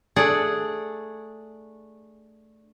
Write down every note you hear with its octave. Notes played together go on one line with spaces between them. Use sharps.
A3 D4 G#4 D5 F#5